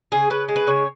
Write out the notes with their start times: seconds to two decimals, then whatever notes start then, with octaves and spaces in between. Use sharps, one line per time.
0.12 C#3 G#4
0.30 C#3 B4
0.49 G#3
0.56 B4
0.67 C#3 C#5